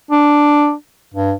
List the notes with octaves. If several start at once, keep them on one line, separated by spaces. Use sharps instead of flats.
D4
G2